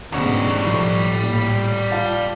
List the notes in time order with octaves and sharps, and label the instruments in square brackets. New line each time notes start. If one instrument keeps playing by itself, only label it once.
[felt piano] D2 D3 C#4 [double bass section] G#2 B2 D#3 [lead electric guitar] G3 C#5
[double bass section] A2 [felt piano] F3 C#6
[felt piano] A#2
F4 F5 A5